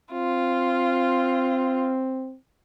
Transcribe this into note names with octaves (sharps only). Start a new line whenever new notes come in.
C4 F4